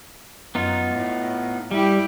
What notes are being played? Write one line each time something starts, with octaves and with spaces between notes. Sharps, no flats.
F#2 B3 D#4 F4
A2
G3 E4 G4